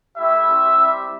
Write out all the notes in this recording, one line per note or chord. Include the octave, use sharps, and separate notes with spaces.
A3 E4 G4 E5
G3 C4 E4 G4
G3 C4 E4 G4